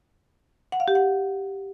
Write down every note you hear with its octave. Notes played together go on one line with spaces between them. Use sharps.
F#5
F5
G4
F#5